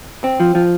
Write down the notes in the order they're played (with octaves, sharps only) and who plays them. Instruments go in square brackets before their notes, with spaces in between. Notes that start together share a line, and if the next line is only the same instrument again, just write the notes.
[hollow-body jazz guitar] C4
F3
F3